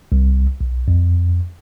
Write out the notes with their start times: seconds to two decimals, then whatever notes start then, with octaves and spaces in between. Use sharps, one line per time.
0.12 C2
0.61 B1
0.88 F2